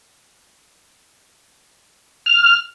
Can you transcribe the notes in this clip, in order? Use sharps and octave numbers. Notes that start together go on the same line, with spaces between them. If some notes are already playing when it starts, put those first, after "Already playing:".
F6